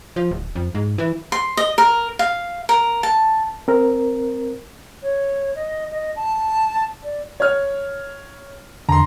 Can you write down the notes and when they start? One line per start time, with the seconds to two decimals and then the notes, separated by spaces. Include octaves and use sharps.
0.16 F3
0.31 D1
0.55 F2
0.75 G#2
0.98 E3
1.32 C6
1.57 D#5
1.78 A#4
2.19 F5
2.69 A#4
3.03 A5
3.68 C4 A#4
5.03 C#5
5.55 D#5
5.91 D#5
6.16 A5
7.03 D5
7.40 C#5 F6
8.89 E2 D3 A#5 C6